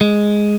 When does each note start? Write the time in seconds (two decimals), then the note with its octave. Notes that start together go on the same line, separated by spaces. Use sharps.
0.01 G#3